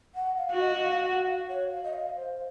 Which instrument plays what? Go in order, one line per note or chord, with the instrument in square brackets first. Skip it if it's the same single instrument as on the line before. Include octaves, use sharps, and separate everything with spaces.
[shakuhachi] F#5
F5
[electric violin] F#4
[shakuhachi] D#5
F5
F#5
F5
C#5
F5
D#5
F5
C5